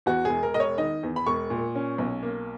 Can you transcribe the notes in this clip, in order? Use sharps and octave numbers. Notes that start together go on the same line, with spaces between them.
E2 F#4
E1 G#4
A#4
E1 D#5
C#5
D#3 D#5
E2
B5
E1 C#6
A#2
C#4
B1
A#3